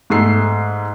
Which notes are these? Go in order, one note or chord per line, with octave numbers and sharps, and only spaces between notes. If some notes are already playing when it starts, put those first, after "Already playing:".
G#2 A3 C7